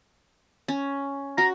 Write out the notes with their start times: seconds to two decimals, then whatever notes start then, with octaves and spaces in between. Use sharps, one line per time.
0.68 C#4
1.38 F#4 A#5